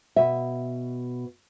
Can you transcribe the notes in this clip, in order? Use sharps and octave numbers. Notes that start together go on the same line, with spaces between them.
B2 E5